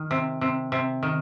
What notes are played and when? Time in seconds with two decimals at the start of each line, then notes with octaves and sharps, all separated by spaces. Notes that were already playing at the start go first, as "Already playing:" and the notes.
Already playing: D#3
0.11 C3
0.41 C3
0.72 C3
1.03 D#3